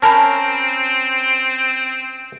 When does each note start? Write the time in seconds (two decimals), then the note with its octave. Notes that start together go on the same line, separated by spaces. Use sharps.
0.02 C4 C#4 A#4 A5 B5